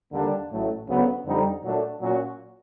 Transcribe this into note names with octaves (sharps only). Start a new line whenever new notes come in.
D#2 D3 G3 A#3 D4
A1 A2 F#3 A3
D2 C#3 F#3 B3
F2 D3 G3 C4 D#4
A#2 F#3 A3 D4
A#2 F#3 A#3 C#4 F#4